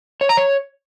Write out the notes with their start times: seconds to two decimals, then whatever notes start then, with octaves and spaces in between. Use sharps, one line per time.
0.21 C#5
0.29 A#5
0.37 C#5